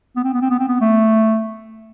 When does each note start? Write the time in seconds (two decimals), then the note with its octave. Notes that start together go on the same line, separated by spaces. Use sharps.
0.16 B3
0.24 C4
0.34 B3
0.42 C4
0.50 B3
0.59 C4
0.68 B3
0.81 A3